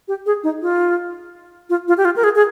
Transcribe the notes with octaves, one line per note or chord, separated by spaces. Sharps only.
G4
G#4
D#4
F4
F4
F4
G4
F4
A#4
G#4
G#4